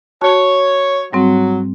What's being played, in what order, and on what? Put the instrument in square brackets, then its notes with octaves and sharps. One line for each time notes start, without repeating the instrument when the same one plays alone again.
[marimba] F#4 A5 [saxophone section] C#5
[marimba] G#2 G3 C4 [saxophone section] F#3